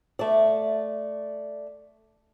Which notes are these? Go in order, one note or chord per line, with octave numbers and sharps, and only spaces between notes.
A3 D5